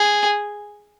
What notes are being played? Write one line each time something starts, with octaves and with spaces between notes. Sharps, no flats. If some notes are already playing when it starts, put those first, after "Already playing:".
Already playing: G#4